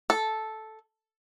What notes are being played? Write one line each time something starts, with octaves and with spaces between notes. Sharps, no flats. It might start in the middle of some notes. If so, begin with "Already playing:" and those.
A4